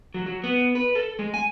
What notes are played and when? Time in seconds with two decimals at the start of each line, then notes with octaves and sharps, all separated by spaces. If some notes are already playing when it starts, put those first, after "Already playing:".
0.14 F#3
0.26 F#3
0.44 B3
0.75 B4
0.95 A4
1.19 G#3
1.34 G#5